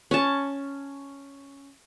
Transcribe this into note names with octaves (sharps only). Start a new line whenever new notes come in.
C#4 A5